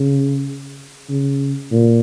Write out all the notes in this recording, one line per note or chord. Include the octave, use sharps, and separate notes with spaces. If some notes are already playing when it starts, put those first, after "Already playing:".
Already playing: C#3
C#3
A#2